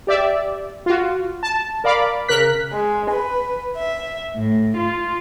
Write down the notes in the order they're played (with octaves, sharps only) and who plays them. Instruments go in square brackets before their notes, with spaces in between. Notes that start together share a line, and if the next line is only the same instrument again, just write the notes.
[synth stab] G4 D5 E5
F4 F#4
A5
A#4 D5 F5 B5 D6
C#3 A#4 F#6 B6
[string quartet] G#3
B4
E5
A2
F4